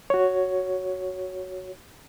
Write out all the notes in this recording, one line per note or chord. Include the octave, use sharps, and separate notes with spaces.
F#4 C#5